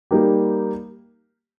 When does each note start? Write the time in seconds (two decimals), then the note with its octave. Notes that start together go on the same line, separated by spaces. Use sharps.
0.11 G3 A#3 D#4 G4